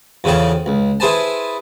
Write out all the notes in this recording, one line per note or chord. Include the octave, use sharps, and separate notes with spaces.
E2 C#3 F3 A4 C#5 G5
C#2
E4 G#4 B4 C5 G#5 A5